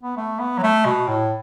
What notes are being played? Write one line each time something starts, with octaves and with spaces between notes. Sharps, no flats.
B3
A3
B3
F#3
A3
B2
A2